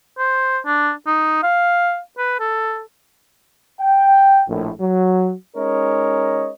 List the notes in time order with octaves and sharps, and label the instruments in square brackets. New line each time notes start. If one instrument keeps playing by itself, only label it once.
[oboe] C5
D4
D#4
F5
B4
A4
[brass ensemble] G5
A#1 A2
F#3
G#3 C#4 D#4 A#4 C#5 D#5